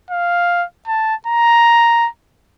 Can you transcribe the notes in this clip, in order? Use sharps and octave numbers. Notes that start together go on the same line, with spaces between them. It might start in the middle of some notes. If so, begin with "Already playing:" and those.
F5
A5
A#5